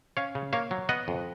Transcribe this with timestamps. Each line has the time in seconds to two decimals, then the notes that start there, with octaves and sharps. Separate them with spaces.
0.17 C#4 C#5 F5
0.35 C#3
0.53 A#3 C#5 F5
0.71 F#3
0.89 B3 D#5 F#5
1.08 F2